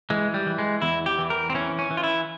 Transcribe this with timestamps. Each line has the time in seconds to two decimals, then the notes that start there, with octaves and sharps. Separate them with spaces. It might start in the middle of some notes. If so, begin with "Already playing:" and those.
0.10 E3 G#3
0.34 G3
0.46 E3
0.59 G#3
0.82 E2 E4
1.06 G4
1.18 E3
1.30 A#4
1.50 C4
1.54 E3 C#4
1.79 C#4
1.91 E3
1.97 F4
2.03 E4